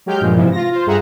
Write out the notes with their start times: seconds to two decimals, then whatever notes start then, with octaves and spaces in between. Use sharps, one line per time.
0.06 F#3 G#3 G4 F6 G6
0.21 G2 A#2 F3 G#3
0.37 G#2 C3 E3 F3
0.52 F4 A#6
0.72 F4 C5
0.87 G2 G#4 E5 F#5 A#5